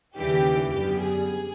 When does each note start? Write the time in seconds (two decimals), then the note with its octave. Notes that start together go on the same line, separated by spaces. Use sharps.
0.15 D#2 C#3 E3 G3 G4
0.72 F#2 D3 G3 B3 G4
1.01 G#4